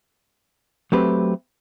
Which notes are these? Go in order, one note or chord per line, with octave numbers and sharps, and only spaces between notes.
F#3 A3 C4 G4 B4